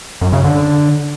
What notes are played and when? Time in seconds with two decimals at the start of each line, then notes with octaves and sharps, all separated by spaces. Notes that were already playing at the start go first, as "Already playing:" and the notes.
0.21 F#2
0.33 C#3
0.44 D3